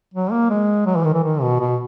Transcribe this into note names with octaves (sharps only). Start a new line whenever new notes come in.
F#3
A#3
G#3
F#3
E3
D#3
E3
D#3
B2
B2